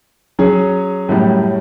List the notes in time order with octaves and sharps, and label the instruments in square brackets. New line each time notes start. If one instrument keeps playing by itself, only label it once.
[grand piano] F#3 C#4 G#4
[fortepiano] F#2 A2 G3